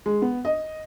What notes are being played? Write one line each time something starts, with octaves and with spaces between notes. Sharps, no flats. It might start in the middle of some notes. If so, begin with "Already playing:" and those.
G#3
B3
D#5